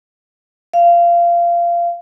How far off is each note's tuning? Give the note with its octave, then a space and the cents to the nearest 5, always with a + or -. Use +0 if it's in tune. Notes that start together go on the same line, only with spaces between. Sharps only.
F5 -20